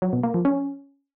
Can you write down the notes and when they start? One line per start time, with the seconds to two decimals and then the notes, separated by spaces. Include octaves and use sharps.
0.02 F#3
0.13 B2
0.23 A#3
0.34 F3
0.45 C#4